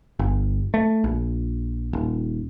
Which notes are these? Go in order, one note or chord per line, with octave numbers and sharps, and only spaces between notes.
G1
A3
A#1
D#1